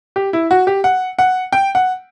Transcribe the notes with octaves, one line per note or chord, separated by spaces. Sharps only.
G4
E4
F#4
G4
F#5
F#5
G5
F#5